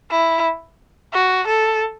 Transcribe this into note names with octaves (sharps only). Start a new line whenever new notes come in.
E4
F#4
A4